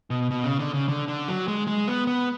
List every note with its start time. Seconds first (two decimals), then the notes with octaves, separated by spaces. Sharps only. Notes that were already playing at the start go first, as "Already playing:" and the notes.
0.10 B2
0.31 B2
0.44 C#3
0.59 D3
0.74 C#3
0.88 D3
1.08 D3
1.28 F#3
1.48 G#3
1.67 G#3
1.87 B3
2.07 B3